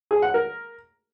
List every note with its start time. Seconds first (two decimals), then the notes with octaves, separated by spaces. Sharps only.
0.11 G#4
0.22 F#5
0.34 A#4